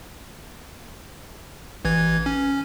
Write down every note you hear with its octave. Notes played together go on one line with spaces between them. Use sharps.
A1 E3 G#6
C#4